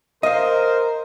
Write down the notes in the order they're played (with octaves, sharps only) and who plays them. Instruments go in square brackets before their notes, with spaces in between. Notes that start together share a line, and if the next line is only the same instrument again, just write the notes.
[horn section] A#4 C5 [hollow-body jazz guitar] D#5 F5